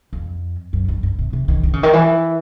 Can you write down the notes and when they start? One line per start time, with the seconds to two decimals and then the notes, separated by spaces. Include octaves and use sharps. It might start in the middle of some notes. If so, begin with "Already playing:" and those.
0.13 F2
0.73 F#2
0.88 G2
1.03 G2
1.19 C3
1.33 C3
1.48 D#3
1.63 D#3
1.73 C#3
1.83 D#3
1.93 E3